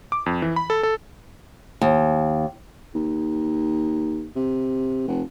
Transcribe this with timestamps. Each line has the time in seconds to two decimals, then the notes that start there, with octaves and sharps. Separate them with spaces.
0.12 D6
0.26 F2
0.42 E3
0.56 B5
0.70 A4
0.83 A4
1.81 D#2
2.95 D#2
4.36 C3
5.07 F1